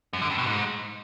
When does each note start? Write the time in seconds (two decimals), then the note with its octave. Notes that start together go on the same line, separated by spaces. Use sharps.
0.13 F#2
0.22 D3
0.30 G2
0.38 B2
0.46 G#2